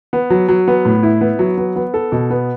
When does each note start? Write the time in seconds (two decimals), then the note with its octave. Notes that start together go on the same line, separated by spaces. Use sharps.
0.13 B3
0.30 F#3
0.49 F#3
0.68 B3
0.85 A2
1.03 E4
1.21 B3
1.39 F#3
1.58 B3
1.76 B3
1.94 A4
2.12 B2
2.30 B3